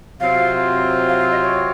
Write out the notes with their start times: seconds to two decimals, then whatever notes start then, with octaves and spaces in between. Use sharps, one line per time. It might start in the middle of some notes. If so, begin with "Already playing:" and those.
0.20 C3 F#3 C4 F4 F5
1.09 F5
1.20 F5
1.31 D#5
1.42 C#5